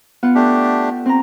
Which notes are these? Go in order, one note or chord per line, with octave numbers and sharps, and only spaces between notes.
B3 F4 F#5
A3 D4 G4
C4 A#5